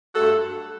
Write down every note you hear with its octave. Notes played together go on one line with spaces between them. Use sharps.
G2 F#3 A3 F#4 A4